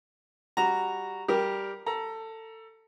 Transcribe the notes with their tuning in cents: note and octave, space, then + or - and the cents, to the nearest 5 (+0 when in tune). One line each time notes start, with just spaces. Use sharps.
G3 +5 F#4 +0 A#5 -5
G3 +0 G4 +0 A#4 +0
A4 +20 A#5 +20